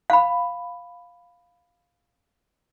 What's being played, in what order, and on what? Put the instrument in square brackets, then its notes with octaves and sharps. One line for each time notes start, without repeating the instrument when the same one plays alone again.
[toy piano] F5 B5